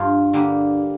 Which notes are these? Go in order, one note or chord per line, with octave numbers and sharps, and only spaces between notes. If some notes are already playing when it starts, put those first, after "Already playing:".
Already playing: G2 F4
D3 G3 A#3